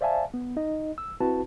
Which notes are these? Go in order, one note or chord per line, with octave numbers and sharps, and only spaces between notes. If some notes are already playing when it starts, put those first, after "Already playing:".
C5 D5 E5 F5 G#5 A5
B3
D#4 D#5
E6
C4 E4 F#4 B4 A5